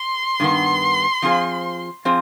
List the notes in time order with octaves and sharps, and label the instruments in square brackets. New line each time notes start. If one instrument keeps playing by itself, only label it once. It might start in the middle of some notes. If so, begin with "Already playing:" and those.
Already playing: [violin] C6
[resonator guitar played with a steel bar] G2 D#3 B3
F3 C4 F4 G#4 C5
F3 C4 F4 G#4 C5